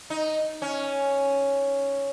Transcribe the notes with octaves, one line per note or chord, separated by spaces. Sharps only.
D#4
C#4